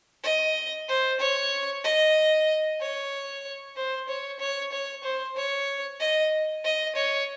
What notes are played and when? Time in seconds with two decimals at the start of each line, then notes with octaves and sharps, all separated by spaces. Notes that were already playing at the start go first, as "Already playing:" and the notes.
0.24 D#5
0.89 C5
1.20 C#5
1.84 D#5
2.80 C#5
3.76 C5
4.08 C#5
4.40 C#5
4.72 C#5
5.04 C5
5.36 C#5
6.00 D#5
6.65 D#5
6.96 C#5